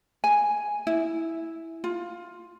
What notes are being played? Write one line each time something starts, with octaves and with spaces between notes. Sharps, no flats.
G#5
E4
F4